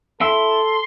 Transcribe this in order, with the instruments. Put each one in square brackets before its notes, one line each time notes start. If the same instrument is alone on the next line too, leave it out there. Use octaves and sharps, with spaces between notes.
[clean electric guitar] E4 E5 [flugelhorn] A4 [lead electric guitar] C6 [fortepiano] E6